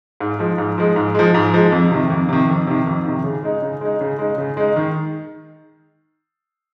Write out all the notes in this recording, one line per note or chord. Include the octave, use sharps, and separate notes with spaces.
G#2
F3 G#3
G#2
F3 G#3
G#2
F3 G#3
G#2
F3 G#3
F2
C3 D#3
F2
C3 D#3
F2
C3 D#3
F2
C3 D#3
C#3
G#3 D#4
C#3
G#3 D#4
C#3
G#3 D#4
C#3
G#3 D#4
D#3